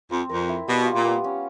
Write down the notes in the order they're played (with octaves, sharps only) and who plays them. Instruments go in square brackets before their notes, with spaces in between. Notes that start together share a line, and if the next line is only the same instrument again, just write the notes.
[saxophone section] F2 [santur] C4
[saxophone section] F2 [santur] A#4
[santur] E4
[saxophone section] B2 [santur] G3
[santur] F4
[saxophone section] A#2
[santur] B3
C#4